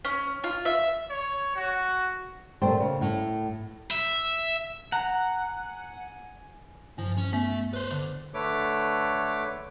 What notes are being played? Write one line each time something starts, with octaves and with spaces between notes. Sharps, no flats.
C#4
F4
E5
C#5
F#4
A#2 A3 C5 G5
C#3
A2
E5
F#5 G#5 A#5
G2 F3
C#4
A3 B3
B4 C5
D3
D3 A3 A4 B4 C#5 D6